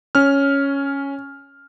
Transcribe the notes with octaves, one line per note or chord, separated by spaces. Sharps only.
C#4 F6